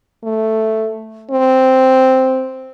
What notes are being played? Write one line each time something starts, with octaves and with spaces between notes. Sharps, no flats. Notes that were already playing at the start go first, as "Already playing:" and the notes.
A3
C4